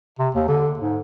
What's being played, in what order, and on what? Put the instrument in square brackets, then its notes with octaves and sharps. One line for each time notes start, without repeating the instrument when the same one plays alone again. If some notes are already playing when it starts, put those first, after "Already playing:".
[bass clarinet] C3
D#2
D3
G#2